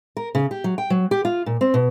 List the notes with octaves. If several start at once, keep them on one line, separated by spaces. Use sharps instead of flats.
A#4
C#3
G4
F#3
G5
F#3
G4
F4
A#2
C4
B2